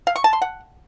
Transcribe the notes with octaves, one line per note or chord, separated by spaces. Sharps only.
F5
C#6
A5
C6
F#5